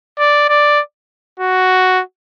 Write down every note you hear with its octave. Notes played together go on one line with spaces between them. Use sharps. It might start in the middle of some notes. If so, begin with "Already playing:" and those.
D5
D5
F#4